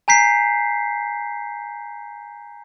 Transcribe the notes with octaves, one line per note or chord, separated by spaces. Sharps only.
G#5 A#5 G6 B6 C7